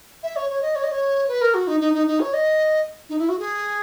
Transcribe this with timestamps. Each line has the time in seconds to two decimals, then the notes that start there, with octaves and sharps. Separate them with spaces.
0.23 E5
0.36 C#5
0.50 C#5
0.62 D#5
0.76 C#5
0.84 D#5
0.92 C#5
1.28 B4
1.41 A#4
1.54 F#4
1.67 D#4
1.81 D#4
1.94 D#4
2.07 D#4
2.20 C#5
2.34 D#5
3.09 D#4
3.19 E4
3.29 F#4
3.39 G#4